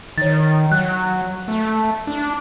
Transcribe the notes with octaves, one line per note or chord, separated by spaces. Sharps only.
D#3 C#5 A6
F#3 F#6
A3
D4